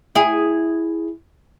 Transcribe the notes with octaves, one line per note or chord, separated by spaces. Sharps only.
E4 G#4